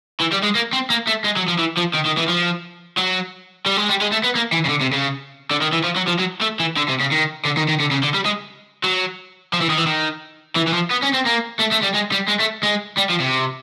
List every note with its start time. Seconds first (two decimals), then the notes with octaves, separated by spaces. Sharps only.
0.21 E3
0.33 G3
0.44 G#3
0.55 A#3
0.73 C4
0.90 A#3
1.07 A3
1.24 G#3
1.37 F#3
1.48 F3
1.59 E3
1.77 F3
1.94 D#3
2.05 D#3
2.17 E3
2.28 F3
2.97 F#3
3.66 G3
3.77 G#3
3.89 G3
4.01 G#3
4.12 A3
4.23 B3
4.35 A#3
4.52 E3
4.65 C#3
4.69 D3
4.81 C3
4.93 C#3
5.51 D3
5.62 D#3
5.73 E3
5.84 F3
5.96 F#3
6.08 F3
6.19 F#3
6.41 A3
6.60 E3
6.76 D3
6.88 C3
7.00 C#3
7.11 D#3
7.45 D3
7.57 D#3
7.69 D#3
7.80 D3
7.91 C#3
8.03 D3
8.14 G3
8.26 G#3
8.84 F#3
9.53 F3
9.61 E3
9.70 D#3
9.78 E3
9.87 D#3
10.56 E3
10.67 E3
10.73 F3
10.90 B3
11.02 C#4
11.13 C4
11.26 A#3
11.59 A3
11.71 A3
11.82 G3
11.94 G#3
12.12 G3
12.28 G#3
12.40 A3
12.63 G#3
12.97 G3
13.09 F3
13.20 C3